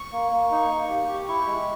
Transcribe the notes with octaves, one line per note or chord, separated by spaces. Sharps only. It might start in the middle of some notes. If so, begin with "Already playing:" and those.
Already playing: C#6
A#3
A#3
D#4
A#3
G4
G4
E4 C#6
G#3